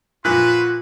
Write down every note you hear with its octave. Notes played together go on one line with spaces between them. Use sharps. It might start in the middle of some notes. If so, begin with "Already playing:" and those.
A#2 F3 F4 F#4 B4 F#6